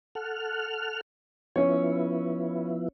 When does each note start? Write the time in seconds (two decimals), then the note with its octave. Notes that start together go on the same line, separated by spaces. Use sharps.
0.15 A4 F#5 F6
1.56 F3 B3 C#4 E4 C#5